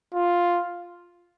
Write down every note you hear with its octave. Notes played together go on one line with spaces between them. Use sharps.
F4